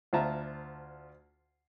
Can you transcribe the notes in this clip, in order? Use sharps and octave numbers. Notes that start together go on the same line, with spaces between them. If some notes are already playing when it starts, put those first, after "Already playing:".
D2 F4 C5 E5 A5 A#5